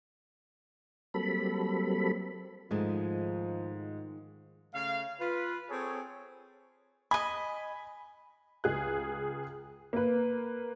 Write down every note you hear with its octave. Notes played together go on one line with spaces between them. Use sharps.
F#3 G3 A#3 C4 A4 B5
G#2 D#3 F3 G#3 A3
C#3 A3 F5
F4 B4
C4 G#4 A4 C#5
D#5 G#5 B5
C#2 G#4 F#6
A#3 B4